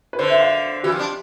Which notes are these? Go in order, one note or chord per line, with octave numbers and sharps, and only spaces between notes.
B4
D3 C5
E5
F5
E3 G4
F3
D4